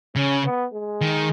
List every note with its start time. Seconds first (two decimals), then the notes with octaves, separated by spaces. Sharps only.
0.16 C#3 C#4
0.45 B3
0.74 G#3
1.01 D#3